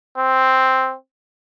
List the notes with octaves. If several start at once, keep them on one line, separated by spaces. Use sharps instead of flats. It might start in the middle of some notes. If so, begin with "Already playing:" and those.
C4